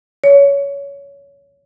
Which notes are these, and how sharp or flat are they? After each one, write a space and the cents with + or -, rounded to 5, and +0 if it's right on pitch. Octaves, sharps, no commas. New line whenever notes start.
C#5 +20